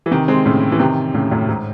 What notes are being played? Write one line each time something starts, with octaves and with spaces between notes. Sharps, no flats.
E3
C3 D#3
G#3 C4
A2 C#3
E3
C3 D#3
A2 C#3
F#2 A2
G#2